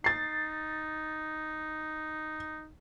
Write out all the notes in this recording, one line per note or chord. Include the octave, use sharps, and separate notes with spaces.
D#4 A6 C7